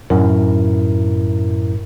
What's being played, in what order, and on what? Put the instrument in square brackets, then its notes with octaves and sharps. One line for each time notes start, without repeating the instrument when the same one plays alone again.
[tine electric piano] F#2 A2 E4 A#4